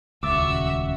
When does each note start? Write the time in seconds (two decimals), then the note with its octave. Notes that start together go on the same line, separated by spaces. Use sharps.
0.23 D#1 C#2 F#4 E5 D6 E6 A6